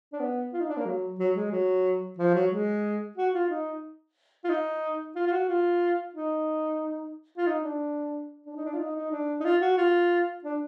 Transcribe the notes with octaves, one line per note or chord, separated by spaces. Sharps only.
D4
B3
F4
D#4
D4
A#3
F#3
F#3
G#3
F#3
F3
F#3
G#3
F#4
F4
D#4
F4
D#4
F4
F4
F#4
F4
D#4
F4
D#4
D4
D4
D#4
D4
F4
D#4
D#4
D4
D#4
F4
F#4
F4
D4